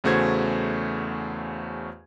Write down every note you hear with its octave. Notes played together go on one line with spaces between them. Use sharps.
E2 C#3 A3 F#4 C5 G#6